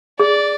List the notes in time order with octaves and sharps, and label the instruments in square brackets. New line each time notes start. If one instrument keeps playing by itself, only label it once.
[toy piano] G#4 [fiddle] D5